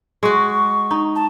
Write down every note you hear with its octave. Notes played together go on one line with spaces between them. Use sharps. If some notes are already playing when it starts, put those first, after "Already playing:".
G#3 F#4 C#6
D#4
A5